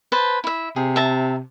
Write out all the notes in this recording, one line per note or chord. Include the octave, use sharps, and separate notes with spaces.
B4 C5 A5
E4 E5
C3 G#4
E5 A5 A#5